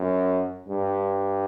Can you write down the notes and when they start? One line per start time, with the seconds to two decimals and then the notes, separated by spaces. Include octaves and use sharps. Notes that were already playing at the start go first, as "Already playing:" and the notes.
Already playing: F#2
0.68 G2